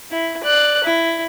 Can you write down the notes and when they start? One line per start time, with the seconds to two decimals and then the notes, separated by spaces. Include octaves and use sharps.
0.11 E4
0.44 D5 F#6
0.84 E4